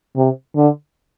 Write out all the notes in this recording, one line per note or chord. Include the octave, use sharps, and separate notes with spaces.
C3
D3